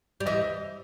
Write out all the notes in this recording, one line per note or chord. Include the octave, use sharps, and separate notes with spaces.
G3
E3 D#5